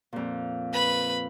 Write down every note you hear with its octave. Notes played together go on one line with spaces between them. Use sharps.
F2 A#2
B4 B5